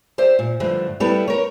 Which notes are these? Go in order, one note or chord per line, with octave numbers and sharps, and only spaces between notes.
G4 C5 D5 E5
A#2
G2 D3 F3 A3
G3 A3 B3 E4 A4 B4
A#4 C#5